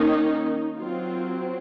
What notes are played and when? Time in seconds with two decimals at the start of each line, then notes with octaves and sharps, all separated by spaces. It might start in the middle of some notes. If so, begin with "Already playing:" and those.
Already playing: D#3 A#3 C#4 D#4
0.78 F#3 C4 F4